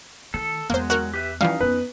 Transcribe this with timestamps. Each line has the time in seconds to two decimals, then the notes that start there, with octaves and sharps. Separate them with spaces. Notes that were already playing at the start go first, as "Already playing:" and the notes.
0.34 D#3 A3 A4
0.70 E2 F#3 G#3 A#3 B3 C5
0.90 F#4 A#4 F#6
1.14 G4 B4 E5
1.41 E3 F3 G3 C#4 D#4 F5
1.60 F2 B3 B4